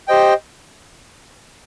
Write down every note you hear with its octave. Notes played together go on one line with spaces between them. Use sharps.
G4 C5 D#5 G5